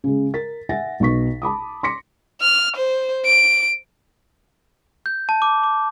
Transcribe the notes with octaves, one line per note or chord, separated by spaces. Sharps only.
C#3 G#3
A#4 A6 B6
E5 F#5 G#5 A6 A#6
B1 B2 C#6 B6
A5 B5 D6 D#6
C6 D6 A#6 B6 C#7
F6
C5
D7
G6
A5
D6
D6